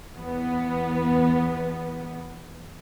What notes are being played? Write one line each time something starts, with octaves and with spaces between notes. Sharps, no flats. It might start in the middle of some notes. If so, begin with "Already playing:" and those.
E2 B3